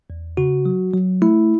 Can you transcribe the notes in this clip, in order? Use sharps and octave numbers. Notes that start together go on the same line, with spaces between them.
E2
C#3 F#4
F#3
F#3
A3 E4